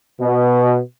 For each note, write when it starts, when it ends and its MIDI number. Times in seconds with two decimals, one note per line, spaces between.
0.21 0.79 47